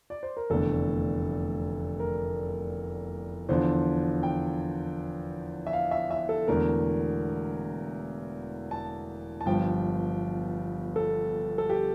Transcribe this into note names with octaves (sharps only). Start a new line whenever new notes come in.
D5
C5
A#4
F1 E2 D3 A3 A4
A#4
E2 D3 F3 C5
G5
E5
F5
E5
E5
A4
E1 E2 D3 A3 A#4
A5
A5
G1 G2 F3 G5
A4
A4
G4